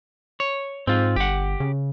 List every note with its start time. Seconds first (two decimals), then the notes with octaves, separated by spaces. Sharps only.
0.40 C#5
0.87 G#2 C4 F4
1.16 G1 G4 F#5
1.60 C#3